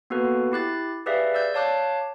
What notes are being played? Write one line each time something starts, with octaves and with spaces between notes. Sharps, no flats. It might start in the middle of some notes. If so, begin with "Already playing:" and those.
A#3 B3 F#4 A4 B4
E4 G4 F#6 A6
G4 G#4 B4 D5 E5 F5
D5 E6 G6
C#5 F5 A5 D6 F#6 G6